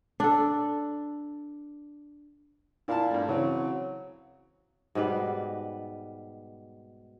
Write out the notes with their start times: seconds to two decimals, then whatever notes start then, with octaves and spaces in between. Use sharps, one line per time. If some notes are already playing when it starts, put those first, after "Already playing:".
0.20 D4 A4
2.88 A#2 E4 F5 A5
3.11 G2 A3
3.28 C#3 E3 F#3 C4
4.95 G#2 B2 G3 B4